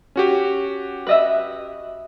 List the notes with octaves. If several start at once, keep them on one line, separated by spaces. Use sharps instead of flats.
C#4 F#4 G4
B4 D#5 E5